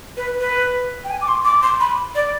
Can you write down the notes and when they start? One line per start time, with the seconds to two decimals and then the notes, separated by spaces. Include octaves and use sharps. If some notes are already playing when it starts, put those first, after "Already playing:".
0.17 B4
0.40 B4
1.04 G5
1.10 G#5
1.21 D6
1.28 C6
1.45 D6
1.63 C6
1.80 B5
2.15 D5